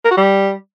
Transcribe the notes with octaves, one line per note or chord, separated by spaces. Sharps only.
A#4
F#4
G3